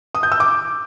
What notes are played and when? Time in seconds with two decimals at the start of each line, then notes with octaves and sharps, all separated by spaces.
0.15 D#6
0.23 G6
0.32 E6
0.40 D6